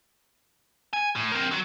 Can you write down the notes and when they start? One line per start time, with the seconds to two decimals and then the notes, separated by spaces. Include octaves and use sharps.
0.93 G#5
1.16 A2
1.32 C4 A#4
1.51 F#3 F#4